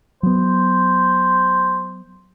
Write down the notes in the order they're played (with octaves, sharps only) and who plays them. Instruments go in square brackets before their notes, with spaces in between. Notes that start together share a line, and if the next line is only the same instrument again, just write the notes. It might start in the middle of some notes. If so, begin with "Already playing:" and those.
[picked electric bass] F#3 B3 [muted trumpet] C5